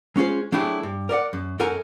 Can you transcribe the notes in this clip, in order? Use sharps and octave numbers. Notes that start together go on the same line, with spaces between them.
G#3 C#4 F4 G#4 C5
F#3 A3 D4 E4 G4 G#4
G2
A#4 D5 D#5 F#5
F#2
F#2 A4 A#4 F#5 G#5 A#5